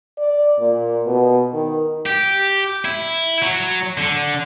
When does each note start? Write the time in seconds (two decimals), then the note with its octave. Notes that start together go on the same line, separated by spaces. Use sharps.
0.18 D5
0.59 A#2
1.06 B2
1.53 D#3
2.06 G4
2.85 E4
3.42 F#3
3.98 D3